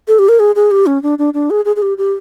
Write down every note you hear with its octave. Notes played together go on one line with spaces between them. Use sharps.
A4
G4
A#4
G#4
G#4
G4
C#4
D4
D4
D4
G#4
G#4
G#4
G4
G4